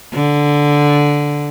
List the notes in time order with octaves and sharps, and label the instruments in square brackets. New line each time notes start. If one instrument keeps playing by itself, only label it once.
[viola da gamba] D3